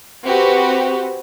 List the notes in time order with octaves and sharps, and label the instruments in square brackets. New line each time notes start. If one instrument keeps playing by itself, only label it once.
[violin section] C4 F#4 G4 B4